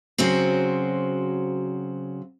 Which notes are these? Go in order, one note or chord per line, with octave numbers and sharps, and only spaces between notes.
C#3 F#3 C4 F#4 C5